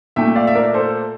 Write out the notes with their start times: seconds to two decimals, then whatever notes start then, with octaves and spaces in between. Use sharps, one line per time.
0.16 A#2 A3 E5 G5
0.36 D5 F5
0.47 E5
0.55 A#4 D5
0.74 A4 C5